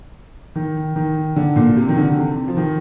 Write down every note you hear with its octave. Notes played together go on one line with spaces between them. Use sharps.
D#3
D#3
D3
A#2
C3
D#3
D3
C3
F3
D#3